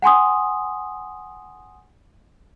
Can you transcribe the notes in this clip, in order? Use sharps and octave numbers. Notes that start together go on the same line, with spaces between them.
F#5 G#5 C6 D#6